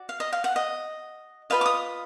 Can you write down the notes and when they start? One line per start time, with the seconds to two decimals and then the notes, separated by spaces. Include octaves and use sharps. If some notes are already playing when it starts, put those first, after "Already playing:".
Already playing: F#4 D5
0.09 F5
0.20 D#5
0.33 F5
0.44 F#5
0.56 D#5
1.50 F4 G#4 B4 D#5 F5
1.61 D6
1.66 D#6